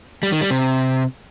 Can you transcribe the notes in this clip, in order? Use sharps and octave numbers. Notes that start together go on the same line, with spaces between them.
G3
D#3
G3
C3